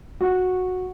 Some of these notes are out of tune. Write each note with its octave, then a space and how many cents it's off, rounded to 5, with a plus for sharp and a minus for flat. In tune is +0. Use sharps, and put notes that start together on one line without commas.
F#4 -10